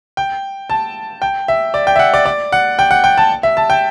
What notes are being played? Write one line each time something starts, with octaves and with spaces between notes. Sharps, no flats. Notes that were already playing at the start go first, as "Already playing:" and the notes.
G5
A5
G5
E5
D5
G5
E5
F#5
D5
D5
F#5
G5
F#5
G5
A5
E5
A5
G5